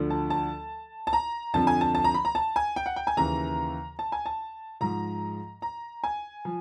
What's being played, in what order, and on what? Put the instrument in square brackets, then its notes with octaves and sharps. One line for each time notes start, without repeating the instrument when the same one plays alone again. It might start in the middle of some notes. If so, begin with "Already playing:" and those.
Already playing: [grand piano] D2 D3 F3
A5
A5
A5
A#5
F2 D3 F3 A5
G#5
A5
A5
A#5
B5
A#5
A5
G#5
G5
F#5
G5
G#5
D#2 C#3 E3 A#5
A5
G#5
A5
G#2 F3 A#5
A#5
G#5
F3